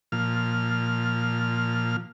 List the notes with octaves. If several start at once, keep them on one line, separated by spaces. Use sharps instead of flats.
A#2 F3 F6